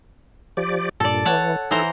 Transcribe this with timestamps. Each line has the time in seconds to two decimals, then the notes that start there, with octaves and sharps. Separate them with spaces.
0.57 F3 G4 D5
1.00 G2 A#2 A4 D5
1.25 E3 C#5 F#5 A5
1.71 E3 D#4 A4 C5 A#5